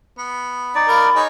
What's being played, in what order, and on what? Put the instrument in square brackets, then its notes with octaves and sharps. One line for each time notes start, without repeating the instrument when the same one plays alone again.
[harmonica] B3
[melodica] D#4 D5
[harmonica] A#4 F5 [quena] B5
[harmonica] D#4 G#4 C#5